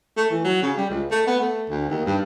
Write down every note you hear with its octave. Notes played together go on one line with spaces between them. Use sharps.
A3
E3
F#3
C#3
G3
C#2
A3
B3
A3
D2
D#2
G2